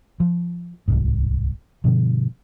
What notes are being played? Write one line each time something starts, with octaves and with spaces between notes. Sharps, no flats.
F3
D1 C2 G#2
G2 B2 D3 F3